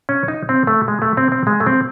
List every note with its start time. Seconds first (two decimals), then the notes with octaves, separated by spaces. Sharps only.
0.09 C#4
0.28 D#4
0.49 C4
0.67 A3
0.88 G#3
1.02 A3
1.17 C4
1.32 C4
1.47 G#3
1.60 A3
1.67 C4